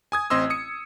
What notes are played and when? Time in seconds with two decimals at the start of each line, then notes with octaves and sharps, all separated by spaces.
0.12 G#5 D#6 G#6
0.30 A1 C4 D#5 C6 E6
0.50 D#6 C#7